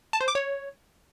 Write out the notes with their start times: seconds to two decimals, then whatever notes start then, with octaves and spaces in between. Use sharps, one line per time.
0.13 A5
0.21 C5
0.28 D6
0.35 C#5